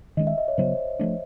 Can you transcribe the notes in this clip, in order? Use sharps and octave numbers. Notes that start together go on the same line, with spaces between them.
D#3 G#3 C#4 D#5
E5
D#5
C#5
C#3 F#3 B3 C5
F3 A3 D4